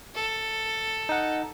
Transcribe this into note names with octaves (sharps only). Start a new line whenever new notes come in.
A4
D#4 F#5